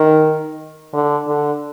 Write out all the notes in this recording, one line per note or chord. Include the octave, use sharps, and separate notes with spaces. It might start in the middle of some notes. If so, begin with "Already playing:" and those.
Already playing: D#3
D3
D3